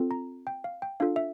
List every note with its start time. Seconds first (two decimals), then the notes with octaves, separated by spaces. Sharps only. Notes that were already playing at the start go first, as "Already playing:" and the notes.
Already playing: C4 F4 A4
0.11 A#5
0.47 G5
0.64 F5
0.82 G5
1.00 D4 F4 A4 F5
1.16 E5